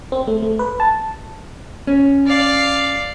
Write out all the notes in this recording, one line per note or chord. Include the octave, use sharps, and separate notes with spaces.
C4
A3
A3
B4
A5
C#4
D5 F5